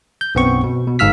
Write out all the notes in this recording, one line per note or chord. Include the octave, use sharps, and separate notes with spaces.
G6
B1 F#2 B3 C4 C#6
B2
B2
G1 G#2 F5 E6 F6 B6